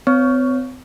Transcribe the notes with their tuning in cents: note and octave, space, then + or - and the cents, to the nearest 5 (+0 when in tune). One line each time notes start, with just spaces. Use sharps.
C4 -40 C#5 +10